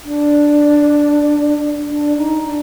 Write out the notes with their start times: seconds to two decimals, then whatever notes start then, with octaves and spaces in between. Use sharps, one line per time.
0.04 D4
1.86 D4
2.17 D#4
2.47 D4